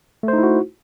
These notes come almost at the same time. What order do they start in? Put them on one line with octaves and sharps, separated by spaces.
A3 C5 D#4 E4 F#4